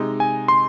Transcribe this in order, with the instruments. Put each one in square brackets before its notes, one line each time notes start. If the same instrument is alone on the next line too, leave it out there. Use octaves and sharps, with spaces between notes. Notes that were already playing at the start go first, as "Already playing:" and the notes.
Already playing: [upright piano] C3 G#3 D#4
[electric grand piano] G#5
C6